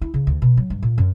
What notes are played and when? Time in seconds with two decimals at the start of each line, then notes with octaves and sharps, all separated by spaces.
0.01 E4
0.14 C#3
0.27 D2
0.42 B2
0.57 F#3
0.70 G2
0.83 A#2
0.98 F#2